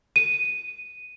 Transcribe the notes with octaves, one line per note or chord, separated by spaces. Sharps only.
D#7